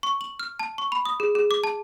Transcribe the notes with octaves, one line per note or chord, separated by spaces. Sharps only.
C#6
F#7
F6
A5
C#6
B5
D#6
G#4
G#4
D6
A5